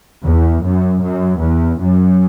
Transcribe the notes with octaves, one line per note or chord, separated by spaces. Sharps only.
E2
F#2
F#2
E2
F#2